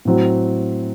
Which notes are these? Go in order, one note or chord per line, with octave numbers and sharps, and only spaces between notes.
A2 F#3 C4